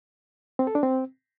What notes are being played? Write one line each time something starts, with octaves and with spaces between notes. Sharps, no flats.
C4
A4
D4
C4